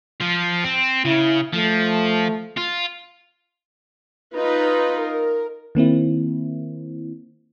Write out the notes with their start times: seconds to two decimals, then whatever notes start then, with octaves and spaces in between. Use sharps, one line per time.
0.21 F3 F4
0.64 C4
1.05 C#3 E4
1.53 F3 A3
2.57 F4
4.34 D#4 F4 B4
5.03 A#4
5.75 D#3 A#3 C4 E4